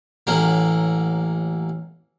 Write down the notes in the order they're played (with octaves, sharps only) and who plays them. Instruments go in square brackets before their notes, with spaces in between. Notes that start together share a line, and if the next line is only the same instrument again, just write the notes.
[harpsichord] A1 F#3 A#3